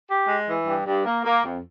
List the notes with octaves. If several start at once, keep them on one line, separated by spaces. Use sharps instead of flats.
G4
G#3
E3
G2
G2
A#3
A#3
F2